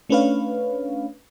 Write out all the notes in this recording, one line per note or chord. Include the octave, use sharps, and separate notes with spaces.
A3 C#4 D4 B4 C#5 F5